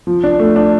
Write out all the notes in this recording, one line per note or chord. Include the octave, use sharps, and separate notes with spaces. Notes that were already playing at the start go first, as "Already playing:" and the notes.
F3
D4
A3
D4